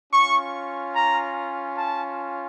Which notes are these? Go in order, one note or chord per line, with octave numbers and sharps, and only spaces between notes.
C#4 F4 C#6
A#5
A5